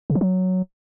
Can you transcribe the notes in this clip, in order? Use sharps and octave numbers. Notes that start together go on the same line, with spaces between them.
C#3
F3
F#3